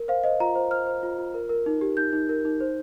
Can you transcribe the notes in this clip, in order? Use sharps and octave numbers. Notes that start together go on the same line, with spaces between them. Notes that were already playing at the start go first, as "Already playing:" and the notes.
Already playing: A#4
C5 F5
C5 D#5
F4 A#5
C5
C5 F6
C5
F4
F4
A#4
A#4
D#4
G4
D#4 G6
D#4
A#4
D#4
C5